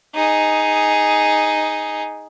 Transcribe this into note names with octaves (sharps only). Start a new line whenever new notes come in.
D#4 G#4